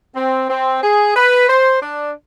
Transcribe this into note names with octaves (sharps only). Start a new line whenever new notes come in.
C4
C4
G#4
B4
C5
D4